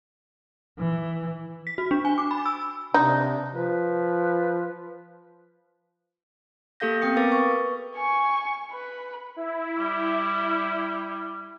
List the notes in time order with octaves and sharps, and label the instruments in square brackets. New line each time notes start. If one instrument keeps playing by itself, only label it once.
[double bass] E3
[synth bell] B6
F#4
D4
G#5
D6
B5
E6
[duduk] C3 [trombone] D4 [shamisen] D#4
[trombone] F3 [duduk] B4
[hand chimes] A#3 G4 A4 F5 G6 A#6
B3 C4 G5 D#6 C#7
A#4 B4 F5 D6 A6
B4 C#6
[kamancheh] G#5 C#6
B4
[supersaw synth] E4
[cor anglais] G3